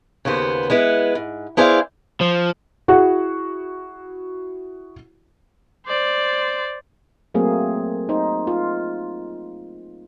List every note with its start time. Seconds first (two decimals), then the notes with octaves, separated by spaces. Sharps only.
0.25 D#2 C#3 A#3 B3 C5
0.70 G#3 B3 E4 B4
1.15 G#2
1.57 B3 E4 G#4 C5 D5 F5
2.21 F3
2.88 E4 F#4 G#4 F#5
5.87 C5 D5
7.34 F#3 A3 A#3 C4 G#4
8.09 D#4 C5
8.47 F4